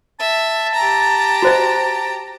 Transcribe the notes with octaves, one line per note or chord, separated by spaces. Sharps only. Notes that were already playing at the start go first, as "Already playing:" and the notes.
E5 A5
G4 A#5
F#4 C5 D#5